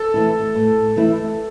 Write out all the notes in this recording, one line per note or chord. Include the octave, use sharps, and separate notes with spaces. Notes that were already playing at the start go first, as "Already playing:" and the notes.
Already playing: A4
E3 A3 E4
A2
E3 A3 E4